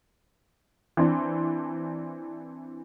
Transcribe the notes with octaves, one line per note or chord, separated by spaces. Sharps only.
E3 C4 D4